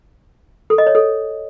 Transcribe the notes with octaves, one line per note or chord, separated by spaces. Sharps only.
A4
D#5
C#5
A4